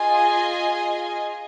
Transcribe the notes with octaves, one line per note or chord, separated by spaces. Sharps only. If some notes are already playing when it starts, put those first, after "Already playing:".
Already playing: F4 G#4 D#5 G#5